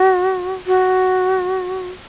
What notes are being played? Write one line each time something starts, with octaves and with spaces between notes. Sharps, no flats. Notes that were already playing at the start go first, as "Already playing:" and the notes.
Already playing: F#4
F#4